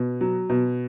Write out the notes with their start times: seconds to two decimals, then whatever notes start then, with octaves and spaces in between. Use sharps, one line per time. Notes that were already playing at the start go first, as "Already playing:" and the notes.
Already playing: B2
0.21 F#3
0.50 B2